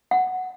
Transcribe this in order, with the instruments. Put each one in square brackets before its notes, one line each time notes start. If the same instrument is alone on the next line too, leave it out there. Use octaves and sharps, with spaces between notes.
[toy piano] F#5